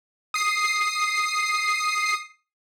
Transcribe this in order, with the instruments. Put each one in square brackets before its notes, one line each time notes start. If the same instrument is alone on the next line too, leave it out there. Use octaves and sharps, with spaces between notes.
[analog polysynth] D#6 C7